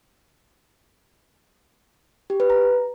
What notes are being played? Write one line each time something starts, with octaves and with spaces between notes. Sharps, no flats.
G4
B4
A#5